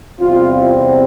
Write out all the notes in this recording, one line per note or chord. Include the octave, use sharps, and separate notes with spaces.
E2 C3 G3 C4 F4